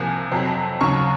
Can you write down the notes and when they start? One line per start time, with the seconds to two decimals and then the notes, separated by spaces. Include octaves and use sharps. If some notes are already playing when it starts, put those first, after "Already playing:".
Already playing: C2 C3 F3 A#3 G#5
0.32 F2 C3 F#3 C4
0.81 D#2 C#3 F#3 C#6